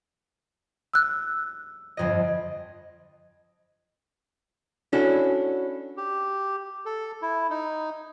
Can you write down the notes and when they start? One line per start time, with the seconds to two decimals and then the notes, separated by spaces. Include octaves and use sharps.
0.94 E6 F#6
1.97 G1 F2 D#5
4.93 C#4 D4 E4 F#4 A4
5.97 G4
6.86 A4
7.22 E4
7.50 D#4